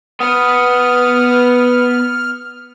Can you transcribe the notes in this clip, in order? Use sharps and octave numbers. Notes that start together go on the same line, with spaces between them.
B3 B4 D#6 F6